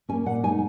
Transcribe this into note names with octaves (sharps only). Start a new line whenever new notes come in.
A#3 C#4 G#5
A#2 F#5
G#3 B3 D#4 G#5